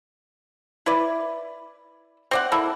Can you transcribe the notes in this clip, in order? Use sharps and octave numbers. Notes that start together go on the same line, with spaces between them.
E4 B4 D5
C4 D5 F#5
A#3 E4 A4